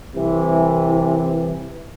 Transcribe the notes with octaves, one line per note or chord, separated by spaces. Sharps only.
C2 C3 E3